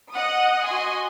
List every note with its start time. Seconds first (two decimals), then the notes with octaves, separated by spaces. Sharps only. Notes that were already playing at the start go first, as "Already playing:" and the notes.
0.13 D#5 F#5 D#6
0.65 F#4 D#5 G#5 C6